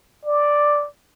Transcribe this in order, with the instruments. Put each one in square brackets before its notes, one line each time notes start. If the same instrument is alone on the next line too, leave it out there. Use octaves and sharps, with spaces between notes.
[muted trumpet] D5